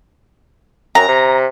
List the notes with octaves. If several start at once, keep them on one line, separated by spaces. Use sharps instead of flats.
F#2 A#5
C3